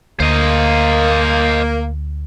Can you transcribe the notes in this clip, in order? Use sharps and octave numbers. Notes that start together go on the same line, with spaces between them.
D2 A#3 C5 D#5